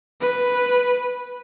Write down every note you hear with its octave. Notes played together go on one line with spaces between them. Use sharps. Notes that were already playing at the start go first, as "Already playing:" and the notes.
B4